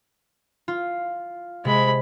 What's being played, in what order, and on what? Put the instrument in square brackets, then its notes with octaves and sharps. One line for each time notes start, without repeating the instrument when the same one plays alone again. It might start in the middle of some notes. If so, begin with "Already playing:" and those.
[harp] F4
[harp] C3 [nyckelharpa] G#3 B5